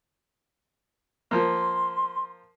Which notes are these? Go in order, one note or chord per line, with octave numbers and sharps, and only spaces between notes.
F3 A#3 C6